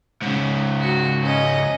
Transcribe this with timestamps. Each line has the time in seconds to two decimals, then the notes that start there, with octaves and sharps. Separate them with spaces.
0.22 G#2 C#3
0.80 F#4
1.23 C#4 D#5